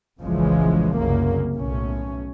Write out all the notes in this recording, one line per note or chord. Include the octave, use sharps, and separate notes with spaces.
F1 A#1 C#3 E3 F3 G#3
C2 F#2 C#3 A#3
B1 A2 C#4